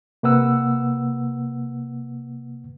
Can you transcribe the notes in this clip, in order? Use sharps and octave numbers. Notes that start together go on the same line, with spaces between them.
C3 A#3 B4 F#5 E6